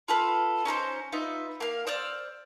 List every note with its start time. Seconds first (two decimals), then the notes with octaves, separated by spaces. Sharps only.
0.08 F4 A4 B4
0.65 C#4 D#4 A4 C5
1.12 D#4 F4 B4 E5
1.60 A#3 F5
1.87 C5 D5 E6 F6